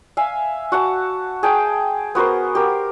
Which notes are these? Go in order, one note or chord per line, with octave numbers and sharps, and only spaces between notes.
E5 F5 G#5
F#4 F#5 A5
G#4 G5 A5
B3 F#4 A#4 C5
G4 A#4